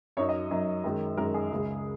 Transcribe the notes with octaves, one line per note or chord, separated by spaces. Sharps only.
F#2 F#3 D#4 C#5
D#5
F#2 F#3 D#4
F#2 D#3 G#3
F#2 D#3 G#3 A#4
G#4
C#2 C#3 G#3